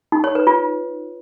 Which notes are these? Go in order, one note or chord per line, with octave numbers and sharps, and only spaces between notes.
D#4
C#5
B4
F4